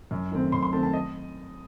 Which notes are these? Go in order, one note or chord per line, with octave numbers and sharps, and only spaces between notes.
F#2
D#3 A3 C4
F#2 C6
C6
D#3 A3 C4 A5
A5
D#5